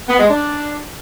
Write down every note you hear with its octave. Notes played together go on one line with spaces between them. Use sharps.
B3
G#3
D4